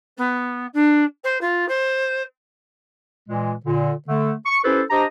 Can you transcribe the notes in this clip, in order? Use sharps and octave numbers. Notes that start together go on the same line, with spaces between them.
B3
D4
C5
F4
C5
A#2 E3 G#3
A#2 D3
D3 A3
C#6
C#4 E4 G4 A4 B4 C5
D4 G4 C5 D#5 A#5